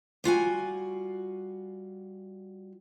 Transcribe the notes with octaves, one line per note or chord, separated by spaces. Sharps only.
G3 F4 F#4 G#5